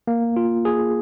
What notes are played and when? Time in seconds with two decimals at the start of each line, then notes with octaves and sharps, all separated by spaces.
0.07 A#3
0.36 F4
0.65 G#4